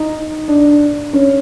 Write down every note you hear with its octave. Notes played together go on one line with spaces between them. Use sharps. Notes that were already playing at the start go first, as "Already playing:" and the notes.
Already playing: D#4
D4
C#4